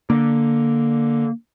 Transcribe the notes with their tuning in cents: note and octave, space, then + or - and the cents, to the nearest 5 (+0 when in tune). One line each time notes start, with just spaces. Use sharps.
D3 +0 A#3 +0